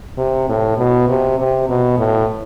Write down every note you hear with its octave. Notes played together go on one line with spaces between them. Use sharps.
C3
A2
B2
C3
C3
B2
A2